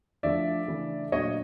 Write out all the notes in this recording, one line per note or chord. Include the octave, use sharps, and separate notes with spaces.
D3 F3 A3 D5 E5
C#3 E3 A3 D4
A#2 F#3 A3 D4 C#5 D#5